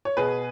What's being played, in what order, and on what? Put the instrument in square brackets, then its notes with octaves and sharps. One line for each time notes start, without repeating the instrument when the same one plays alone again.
[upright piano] C#5
B2 G#4 B4